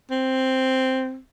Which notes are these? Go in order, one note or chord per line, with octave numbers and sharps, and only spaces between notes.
C4